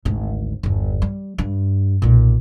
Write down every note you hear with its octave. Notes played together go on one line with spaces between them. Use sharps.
G#1 D2
G1 E2
G3
G2
B1 A#2